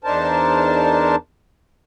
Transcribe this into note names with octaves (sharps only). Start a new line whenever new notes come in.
E2 D4 D#4 A#4 C5 A5